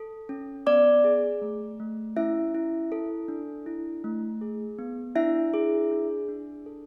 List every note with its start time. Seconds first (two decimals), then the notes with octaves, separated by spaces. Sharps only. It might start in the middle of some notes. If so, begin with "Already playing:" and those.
Already playing: A4
0.29 C#4
0.66 B3 D5 D6
1.04 G#4
1.42 A3
1.80 A3
2.17 C#4 E4 E5
2.55 E4
2.92 A4
3.28 D4
3.66 E4
4.04 A3
4.41 G#4
4.79 B3
5.16 D4 E4 E5
5.54 G#4
5.91 D4
6.29 D4
6.66 A4